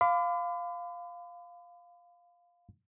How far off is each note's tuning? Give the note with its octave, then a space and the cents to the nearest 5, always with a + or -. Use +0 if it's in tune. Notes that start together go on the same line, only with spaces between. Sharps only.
F5 +5 B5 +45 D6 +0